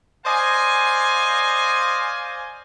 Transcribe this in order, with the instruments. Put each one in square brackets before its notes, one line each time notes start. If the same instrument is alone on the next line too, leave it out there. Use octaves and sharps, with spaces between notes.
[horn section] C5 D5 D#5 F5 G#5